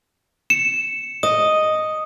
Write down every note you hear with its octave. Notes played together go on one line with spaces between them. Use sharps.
C#7 E7
D#5 D#6